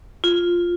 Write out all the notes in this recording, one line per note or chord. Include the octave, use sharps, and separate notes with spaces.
F4